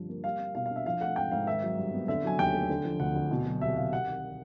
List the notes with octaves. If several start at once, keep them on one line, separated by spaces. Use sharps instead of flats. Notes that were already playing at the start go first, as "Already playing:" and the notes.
Already playing: G2 D3 F3
A#3
G3 F5
A#3
B2 F5
F5
D4
E5
F3 F5
A3 F#5
G#2 G5
G#2 F5
D#3 E5
F#3
G2
B3
D3 E5
F#3 G#5
D#2 G5
A3
D3
F3
D2 F#5
D2
B2
F#3
C2 E5
C2 F5
C3 F#5
D#3